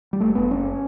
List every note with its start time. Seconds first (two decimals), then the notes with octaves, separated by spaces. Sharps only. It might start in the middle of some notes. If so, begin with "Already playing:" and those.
0.13 G3
0.20 F#1 A3
0.35 F#1 B3
0.51 F#1 C#4